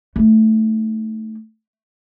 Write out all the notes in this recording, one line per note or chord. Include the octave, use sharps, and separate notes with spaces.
A3 D#4